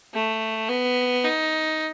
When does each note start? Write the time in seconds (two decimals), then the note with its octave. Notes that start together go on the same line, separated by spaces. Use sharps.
0.14 A3
0.69 B3
1.24 D#4